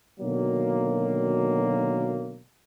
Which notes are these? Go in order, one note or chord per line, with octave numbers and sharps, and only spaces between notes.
B2 D3 D#3 F#3 A#3